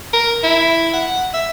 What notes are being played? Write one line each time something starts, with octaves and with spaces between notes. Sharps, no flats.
A#4
E4
F#5
E5